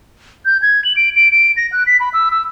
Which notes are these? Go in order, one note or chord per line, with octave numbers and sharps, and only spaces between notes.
G6
G#6
F#7
D7
D7
D7
A#6
F#6
B6
B5
E6
E6